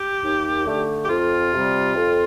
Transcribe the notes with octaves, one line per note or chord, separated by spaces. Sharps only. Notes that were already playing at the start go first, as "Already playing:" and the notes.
Already playing: G4
D#2
D3 A3
G4
F2 F4
C3 G3
F2